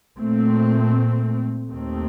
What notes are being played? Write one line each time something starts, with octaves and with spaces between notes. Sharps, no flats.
A#2 A3 C4
D#2 D#3 A3 C4